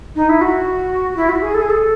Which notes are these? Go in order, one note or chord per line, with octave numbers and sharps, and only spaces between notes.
D#4
E4
F#4
E4
F#4
G#4
A4
G#4
A4